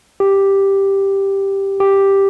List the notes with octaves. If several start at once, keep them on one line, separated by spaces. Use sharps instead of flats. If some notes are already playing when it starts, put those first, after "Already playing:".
G4
G4